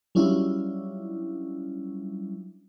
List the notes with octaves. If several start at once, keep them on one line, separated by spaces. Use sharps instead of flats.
F#3 G3 C#4 D4 E4 F4